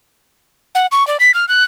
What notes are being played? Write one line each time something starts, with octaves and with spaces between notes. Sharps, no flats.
F#5
C#6
D5
B6
F6
F#6